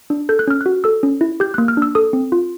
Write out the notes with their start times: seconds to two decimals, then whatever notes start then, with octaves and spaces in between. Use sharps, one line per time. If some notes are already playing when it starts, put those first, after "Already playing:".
0.10 D4
0.29 A4 G6
0.39 F#6
0.47 C#4 F6
0.61 F#4 F#6
0.84 A4 E6
1.03 C#4
1.21 E4
1.40 G4 G6
1.54 A#3 F#6
1.68 F6
1.77 D4 E6
1.95 A4 D#6
2.13 C4
2.32 F4